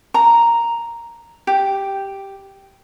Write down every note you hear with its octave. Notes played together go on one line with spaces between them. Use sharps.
A#5
G4